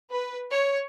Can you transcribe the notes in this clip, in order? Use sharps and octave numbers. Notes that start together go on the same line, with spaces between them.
B4
C#5